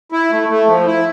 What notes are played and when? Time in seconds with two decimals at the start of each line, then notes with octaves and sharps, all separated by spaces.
0.12 E4
0.31 A3
0.49 A3
0.67 F3
0.86 E4